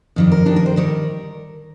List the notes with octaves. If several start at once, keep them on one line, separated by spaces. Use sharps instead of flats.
F2 D#3 G3
A#4
F2 D#3 G3 D4
A#4
C5
D#3 G3 A#4